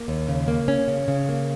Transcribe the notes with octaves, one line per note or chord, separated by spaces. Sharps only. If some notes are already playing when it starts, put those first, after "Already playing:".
Already playing: A#3
D#2
C#3
A#3
C#4
C#3
C#3
A#3